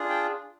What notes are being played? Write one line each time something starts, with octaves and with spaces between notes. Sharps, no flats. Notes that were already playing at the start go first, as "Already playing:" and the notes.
Already playing: D4 F4 G#4
G5